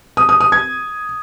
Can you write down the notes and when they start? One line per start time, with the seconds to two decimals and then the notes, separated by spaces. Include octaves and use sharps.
0.17 D#6
0.29 D#6
0.40 D#6
0.52 G#6